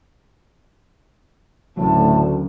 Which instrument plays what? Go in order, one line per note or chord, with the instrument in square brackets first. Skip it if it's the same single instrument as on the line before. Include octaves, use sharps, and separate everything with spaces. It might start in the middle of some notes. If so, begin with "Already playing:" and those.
[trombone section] D2 [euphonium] A2 [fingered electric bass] C#3 F#3 [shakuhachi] A5